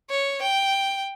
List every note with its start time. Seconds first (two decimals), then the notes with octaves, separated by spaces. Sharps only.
0.10 C#5
0.42 G5